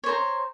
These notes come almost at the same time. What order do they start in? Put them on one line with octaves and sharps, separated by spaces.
C#5 C5 A#5